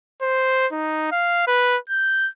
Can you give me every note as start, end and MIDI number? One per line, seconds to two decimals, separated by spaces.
0.22 0.67 72
0.72 1.08 63
1.12 1.44 77
1.47 1.77 71
1.90 2.29 91